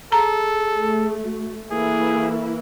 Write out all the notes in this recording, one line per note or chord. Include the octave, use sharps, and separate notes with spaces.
G#4 A4 A#5
A3
F#4
E3 A#3 E4 G#4 A4